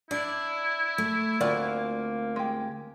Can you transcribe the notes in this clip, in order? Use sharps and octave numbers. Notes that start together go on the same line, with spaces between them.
D4 E4 D5
A3
D2 A#3 C4 F4 F#4 D5
G#3 G4